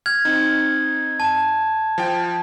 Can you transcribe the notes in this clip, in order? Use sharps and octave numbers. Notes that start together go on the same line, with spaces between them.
F6 G#6
C4 D#4
A5
F3 G5